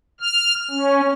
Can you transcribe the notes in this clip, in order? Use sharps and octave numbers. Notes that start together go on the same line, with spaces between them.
F6
C#4